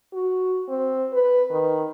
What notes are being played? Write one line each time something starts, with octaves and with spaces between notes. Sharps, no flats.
F#4
C4
B4
D#3